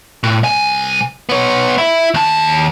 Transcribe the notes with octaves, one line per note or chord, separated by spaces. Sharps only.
A2
C2 G#5
B3 C#5
E4
D#2 A5